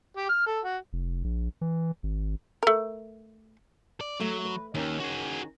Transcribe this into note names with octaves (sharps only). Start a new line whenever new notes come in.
G4
F6
A4
F#4
F1
A#1
E3
G#1
A3 A#4
D5
F#3 A3
B4
D#2 D#3 C#4
F#4 G#4